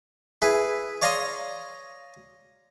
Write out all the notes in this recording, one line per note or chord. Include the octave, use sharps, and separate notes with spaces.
E4 G#4 B4
C#5 D5 F5 A#5 C6 D#6